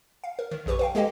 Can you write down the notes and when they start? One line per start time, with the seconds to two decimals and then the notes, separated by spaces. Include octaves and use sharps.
0.24 F5
0.39 A#4
0.51 D#3
0.66 A#1 F#2 G4 B4 C#6
0.79 B4 F5 G5
0.95 G#3 A#3 G4 A4 D#5 G5